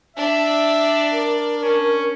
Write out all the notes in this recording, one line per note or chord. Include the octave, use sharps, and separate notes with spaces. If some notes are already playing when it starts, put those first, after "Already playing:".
D4 D5 E5
A#4
C#4